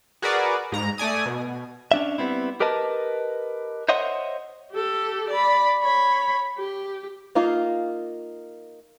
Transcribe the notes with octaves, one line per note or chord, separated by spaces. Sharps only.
F#4 G#4 A#4 B4 D5
G#2 A#5
A3 D5 G#5 D#6
B2
C#4 D4 E5
G3 B3 C4 E4
G4 A#4 B4 D#5 A5
C5 C#5 D#5 E5 F#5 C6
G4 A4
D5 B5
C#5 B5
G4
A#3 D#4 F4